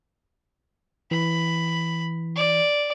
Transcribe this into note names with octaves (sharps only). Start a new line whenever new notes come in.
E3 B5
D5